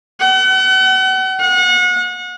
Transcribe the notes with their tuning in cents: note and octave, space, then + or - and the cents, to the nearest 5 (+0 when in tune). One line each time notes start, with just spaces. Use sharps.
F#5 +40
F#5 -35